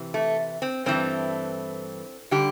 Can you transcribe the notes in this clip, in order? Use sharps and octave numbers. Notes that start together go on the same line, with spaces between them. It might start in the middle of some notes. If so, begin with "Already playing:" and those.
Already playing: C3 E3
A3
C4
G2 E3 A3 C4
D3 G3 G4